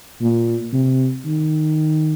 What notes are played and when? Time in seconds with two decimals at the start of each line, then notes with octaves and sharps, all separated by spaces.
0.21 A#2
0.73 C3
1.26 D#3